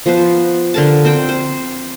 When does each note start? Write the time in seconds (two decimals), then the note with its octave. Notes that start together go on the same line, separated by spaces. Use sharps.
0.06 F3 B3 B4 C5
0.74 D3 A#4 A5
1.05 C4 C5 G5
1.29 C5